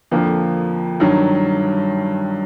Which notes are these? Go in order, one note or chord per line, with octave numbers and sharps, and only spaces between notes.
F2 D3 F3 A#3
G2 D#3 F#3